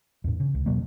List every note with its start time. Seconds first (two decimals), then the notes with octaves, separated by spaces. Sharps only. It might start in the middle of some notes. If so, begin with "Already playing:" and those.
0.24 E2 A2
0.40 C#3
0.55 C#2
0.66 E2 B2 F#3 A#3